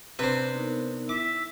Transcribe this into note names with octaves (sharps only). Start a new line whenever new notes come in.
C3 D4 B4 C5
B3 D#4 A#4
E4 E5 D6